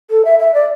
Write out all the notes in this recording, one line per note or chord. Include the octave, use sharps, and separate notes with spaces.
A4
E5
E5
D5